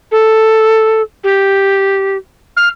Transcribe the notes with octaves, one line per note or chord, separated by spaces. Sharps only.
A4
G4
F6